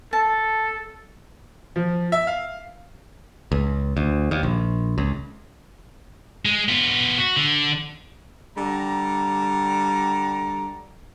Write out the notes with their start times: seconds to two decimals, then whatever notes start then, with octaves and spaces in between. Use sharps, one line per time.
0.13 A4 A5
1.76 F3
2.12 E5
2.27 F5
3.52 C#2
3.97 D2
4.31 D#2
4.43 A#1
4.98 C#2
6.45 G#3
6.69 B3 F4
7.18 F#4
7.37 D3
8.57 D3 G3 A#5